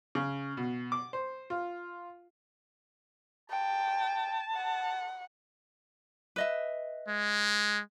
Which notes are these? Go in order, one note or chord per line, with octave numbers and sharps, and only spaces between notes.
C#3
B2
D6
C5
F4
G5 A5
F#5
B4 D#5 E5
G#3